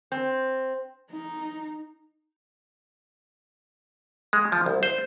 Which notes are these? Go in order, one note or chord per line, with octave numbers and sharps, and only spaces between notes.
C4
D#4
G#3
F3
C2
C5